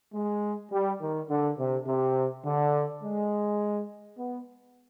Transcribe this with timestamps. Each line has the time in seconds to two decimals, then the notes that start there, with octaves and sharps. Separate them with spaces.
0.14 G#3
0.71 G3
1.01 D#3
1.29 D3
1.58 C3
1.87 C3
2.44 D3
3.02 G#3
4.18 B3